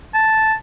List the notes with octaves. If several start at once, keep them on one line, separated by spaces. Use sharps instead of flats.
A5